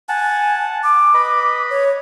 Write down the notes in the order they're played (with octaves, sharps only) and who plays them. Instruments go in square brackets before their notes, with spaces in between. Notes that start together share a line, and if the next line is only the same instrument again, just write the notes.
[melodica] F#5 A5 [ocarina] G#5
[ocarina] D6
[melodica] B4 D#5 B5
[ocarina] C#5